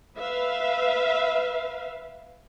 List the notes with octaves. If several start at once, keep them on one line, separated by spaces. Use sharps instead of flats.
B4 E5 F5